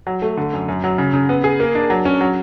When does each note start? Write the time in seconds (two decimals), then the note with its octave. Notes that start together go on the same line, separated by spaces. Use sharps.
0.07 F#3
0.22 A3
0.37 D3
0.53 F#2
0.68 F#2
0.84 F#3
0.98 C#3
1.14 C#3
1.29 B3
1.44 G#4
1.60 A#3
1.75 D4
1.90 F#3
2.05 C#4
2.21 F#3